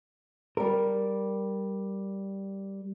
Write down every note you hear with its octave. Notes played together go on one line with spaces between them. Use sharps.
G3 A#4